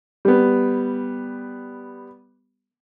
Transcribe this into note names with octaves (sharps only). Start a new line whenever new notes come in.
G3 B3